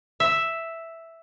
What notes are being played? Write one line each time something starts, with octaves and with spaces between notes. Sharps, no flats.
E5